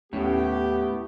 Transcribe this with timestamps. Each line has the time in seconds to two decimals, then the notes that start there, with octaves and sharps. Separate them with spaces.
0.13 D#2 A2 B3 C#4 G4 B6